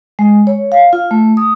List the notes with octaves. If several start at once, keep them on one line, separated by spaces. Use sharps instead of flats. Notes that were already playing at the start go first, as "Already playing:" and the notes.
G#3
C#5
F5
F4
A3
D#6